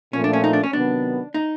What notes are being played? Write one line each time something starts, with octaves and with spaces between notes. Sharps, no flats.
A#2 F3 A3 C#4
D4
C#4
D#4
D4
C#4
C3 D#3 F#3 B3 D4
D#4